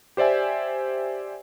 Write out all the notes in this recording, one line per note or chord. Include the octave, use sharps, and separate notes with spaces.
G4 C5 D5 E5 G#5